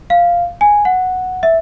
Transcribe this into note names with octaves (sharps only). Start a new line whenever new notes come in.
F5
G#5
F#5
E5